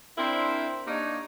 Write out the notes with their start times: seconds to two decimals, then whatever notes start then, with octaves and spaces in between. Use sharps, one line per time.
0.17 C4 D4 E4 A#4 C5
0.87 A#3 D4 D#4 G4 C#5